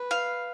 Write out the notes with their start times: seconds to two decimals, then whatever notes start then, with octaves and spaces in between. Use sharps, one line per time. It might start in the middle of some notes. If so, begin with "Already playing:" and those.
Already playing: B4
0.11 F5